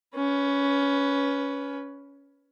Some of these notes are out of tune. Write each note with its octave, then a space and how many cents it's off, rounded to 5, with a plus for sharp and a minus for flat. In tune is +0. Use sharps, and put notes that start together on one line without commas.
C#4 +15 B4 +0